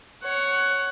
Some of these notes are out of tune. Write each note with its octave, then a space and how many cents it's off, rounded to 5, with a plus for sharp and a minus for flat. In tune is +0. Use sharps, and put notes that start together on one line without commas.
C#5 +0 F#5 +15